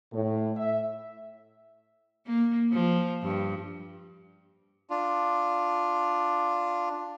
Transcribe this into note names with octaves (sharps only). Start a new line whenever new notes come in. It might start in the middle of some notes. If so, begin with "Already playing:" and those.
A2
E5
A#3
F3
G2
D4 F4